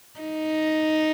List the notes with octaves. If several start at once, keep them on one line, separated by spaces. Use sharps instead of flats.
D#4